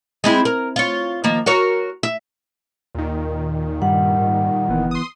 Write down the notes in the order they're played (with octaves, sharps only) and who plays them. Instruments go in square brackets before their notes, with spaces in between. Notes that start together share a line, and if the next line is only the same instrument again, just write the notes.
[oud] G#3 C4 E4
A#4
F4 C#5
D#3 F3 A#3
F#4 A#4 C#5
E5
[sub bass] D#2 [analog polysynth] A#2 D#3
[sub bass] G2 [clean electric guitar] G3 [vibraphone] F#5
[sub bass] G#2
[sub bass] F#1 [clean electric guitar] E3 B3
[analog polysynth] C6 D#6